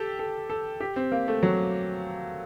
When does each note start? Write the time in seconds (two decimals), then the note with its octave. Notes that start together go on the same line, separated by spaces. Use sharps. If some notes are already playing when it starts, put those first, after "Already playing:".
Already playing: G4 A4
0.19 A4
0.50 A4
0.80 G4
0.96 C4
1.12 A#3
1.28 A3
1.43 F#3